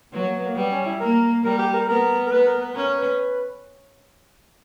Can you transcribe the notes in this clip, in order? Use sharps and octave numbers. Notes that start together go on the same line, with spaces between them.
F#3 B3
A#3
B3
A#3
G3 B3
C#4
E4
A#3 A#4
G3 A#4
G4
A#4
B3 A#4
A#4
B3 B4
A#4
B4
C#4 A#4
B4